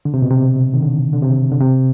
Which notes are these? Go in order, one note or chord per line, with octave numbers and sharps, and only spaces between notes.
D3
C3
B2
C3
D#3
D3
D3
C3
D3
C3